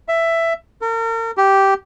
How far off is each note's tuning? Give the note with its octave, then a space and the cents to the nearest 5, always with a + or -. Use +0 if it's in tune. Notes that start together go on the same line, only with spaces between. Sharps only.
E5 +10
A#4 -40
G4 -10